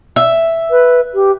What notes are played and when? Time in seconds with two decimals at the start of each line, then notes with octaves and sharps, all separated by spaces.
0.16 E5
0.71 B4
1.15 G4